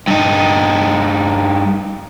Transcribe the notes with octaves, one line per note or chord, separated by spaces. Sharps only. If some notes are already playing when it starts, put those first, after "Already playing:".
G2 D#4